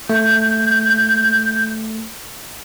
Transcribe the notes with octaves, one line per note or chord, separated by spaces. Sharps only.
A3 G6